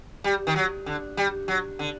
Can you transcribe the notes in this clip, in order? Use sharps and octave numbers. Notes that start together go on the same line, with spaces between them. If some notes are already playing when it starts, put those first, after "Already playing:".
G3
D#3
F#3
D3
G3
F#3
D3